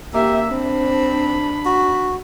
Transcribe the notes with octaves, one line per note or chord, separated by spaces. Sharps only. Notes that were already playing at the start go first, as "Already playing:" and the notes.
A#3 G4 E5
C4 D4 B5
F#4